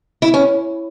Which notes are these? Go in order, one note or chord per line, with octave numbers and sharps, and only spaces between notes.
E4
C#4